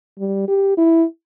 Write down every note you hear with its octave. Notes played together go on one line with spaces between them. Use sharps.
G3
G4
E4